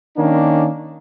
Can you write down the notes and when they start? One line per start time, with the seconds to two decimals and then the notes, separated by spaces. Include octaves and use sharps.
0.17 D#3 A#3 C#4 D4